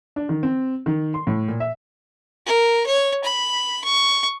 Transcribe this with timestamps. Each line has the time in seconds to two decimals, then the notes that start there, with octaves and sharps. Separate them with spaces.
0.16 D4
0.29 D#3
0.43 C4
0.86 D#3
1.14 C6
1.27 A2
1.48 A#2
1.60 E5
2.46 A#4
2.86 C#5
3.24 B5
3.84 C#6